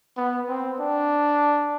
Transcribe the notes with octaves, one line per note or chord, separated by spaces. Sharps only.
B3
C4
D4